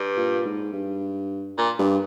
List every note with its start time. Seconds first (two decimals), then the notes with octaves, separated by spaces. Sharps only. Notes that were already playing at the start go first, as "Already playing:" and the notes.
Already playing: G2
0.17 A#2
0.45 G#2
0.73 G2
1.57 A#2
1.79 G2